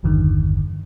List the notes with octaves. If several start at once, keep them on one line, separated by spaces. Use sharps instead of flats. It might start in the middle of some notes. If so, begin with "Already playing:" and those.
G#1 E2 G2 D3 D#3